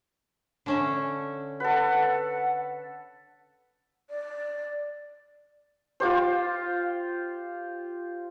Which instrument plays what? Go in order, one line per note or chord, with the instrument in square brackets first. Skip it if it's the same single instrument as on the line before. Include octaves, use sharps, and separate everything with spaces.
[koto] D3 C#4 E5
[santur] A4 B4 [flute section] F#5
[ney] D5
[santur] F4 G4 C5